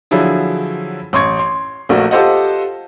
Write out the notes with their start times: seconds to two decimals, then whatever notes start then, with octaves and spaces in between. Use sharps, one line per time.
0.11 D3 F3 F#3 E4 G#4
1.13 A1 C6 C#6 G#6
1.39 C6
1.89 A#1 A3 A#3 F#4
2.11 F4 G4 A4 C5 D#5 F#5